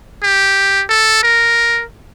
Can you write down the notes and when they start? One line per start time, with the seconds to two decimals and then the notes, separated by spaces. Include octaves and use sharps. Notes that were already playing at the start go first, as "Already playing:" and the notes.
0.23 G4
0.89 A4
1.23 A#4